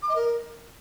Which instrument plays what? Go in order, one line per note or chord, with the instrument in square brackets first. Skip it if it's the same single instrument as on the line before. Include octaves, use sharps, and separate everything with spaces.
[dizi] D6
D#5
A#4